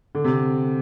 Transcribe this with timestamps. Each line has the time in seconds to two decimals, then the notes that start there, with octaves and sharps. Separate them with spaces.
0.15 D3
0.24 C3